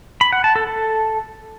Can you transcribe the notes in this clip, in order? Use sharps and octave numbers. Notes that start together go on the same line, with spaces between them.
B5
F#5
A5
A4
A4